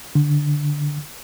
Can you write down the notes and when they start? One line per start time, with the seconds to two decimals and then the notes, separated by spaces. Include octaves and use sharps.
0.15 D3